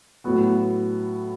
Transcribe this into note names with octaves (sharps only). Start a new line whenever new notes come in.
A2 F#3 B3 F#4